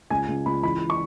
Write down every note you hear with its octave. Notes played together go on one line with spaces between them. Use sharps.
C#2 G#5
C#2
C#2 B5
E3 B5
C#6